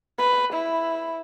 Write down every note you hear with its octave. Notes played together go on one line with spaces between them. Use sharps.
B4
E4